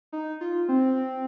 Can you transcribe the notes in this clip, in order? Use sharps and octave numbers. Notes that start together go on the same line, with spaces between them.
D#4
F4
C4